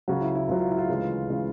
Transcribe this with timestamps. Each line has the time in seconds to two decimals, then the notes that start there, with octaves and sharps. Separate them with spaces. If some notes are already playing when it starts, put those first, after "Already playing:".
0.08 C#2 C#3 F#3 F#4
0.21 E4
0.35 E4
0.48 C#2 C#3 F#3 F4
0.59 F4
0.69 E4
0.78 F4
0.88 D2 C#3 E3 G#3
1.29 C#3 E3 G#3